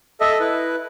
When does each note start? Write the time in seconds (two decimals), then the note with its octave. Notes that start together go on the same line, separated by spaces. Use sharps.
0.21 A4 D#5 E5
0.40 E4 B4